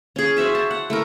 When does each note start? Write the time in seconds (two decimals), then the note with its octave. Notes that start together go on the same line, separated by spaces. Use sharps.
0.16 C#4 G#4
0.36 F#4 C5 E5 G#5
0.55 A5
0.71 F#5
0.90 A3 E4 A#4